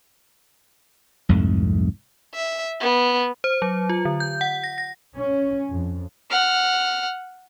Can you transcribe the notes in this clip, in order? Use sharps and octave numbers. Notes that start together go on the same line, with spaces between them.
C2 F2 G#2 A3
E5
B3
C5
F#3
F4
D3
G6
F#5
A#6
A#6
C#4
F2
F#5 F6